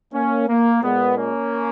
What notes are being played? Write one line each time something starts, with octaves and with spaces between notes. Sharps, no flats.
A#3 C#4
A#3
A#2 G#3 B3
A#3 C#4